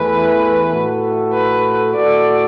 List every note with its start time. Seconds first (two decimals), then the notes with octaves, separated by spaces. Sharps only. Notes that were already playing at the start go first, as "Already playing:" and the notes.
Already playing: E2 E3 A3 B4
0.73 A2 A3 F#4 A4
1.33 B4
1.94 A2 A3 F#4 A4 D5